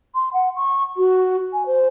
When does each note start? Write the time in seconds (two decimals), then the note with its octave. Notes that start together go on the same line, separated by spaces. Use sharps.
0.15 C6
0.33 F#5
0.56 C#6
0.97 F#4
1.53 G#5
1.66 C5